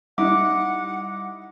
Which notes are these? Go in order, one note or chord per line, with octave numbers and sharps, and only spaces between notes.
G3 D#4 E4 F#5 D6